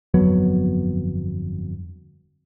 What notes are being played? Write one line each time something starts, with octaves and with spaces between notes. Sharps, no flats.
G1 F2 F#3 B3